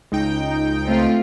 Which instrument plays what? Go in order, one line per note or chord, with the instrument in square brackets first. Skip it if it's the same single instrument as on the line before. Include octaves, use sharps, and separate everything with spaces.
[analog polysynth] C#2 D#4 G5
[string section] A3 C4 F4